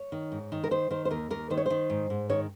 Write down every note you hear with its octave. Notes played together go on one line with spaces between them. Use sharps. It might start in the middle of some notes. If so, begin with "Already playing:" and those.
Already playing: C#5
D#3
G#2
D#3
A#4
D#3 C5
D#3 C5
C5
D#2 A#4
D#2 A#4
D#3 C5
C#5
D#3 C5
G#2
G#2
D#3 C#5